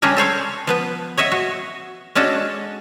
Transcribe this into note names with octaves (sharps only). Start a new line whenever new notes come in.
C#3 G3 C#4 D4 G#4 A#4
A4 C5 C#5 F5
F3 B3 B4
C#5 D#5 E5 F#5
F#4
G#3 C#4 D4 F#4 A4